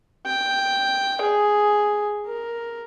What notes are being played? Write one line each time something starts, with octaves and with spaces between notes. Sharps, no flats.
G5
G#4
A#4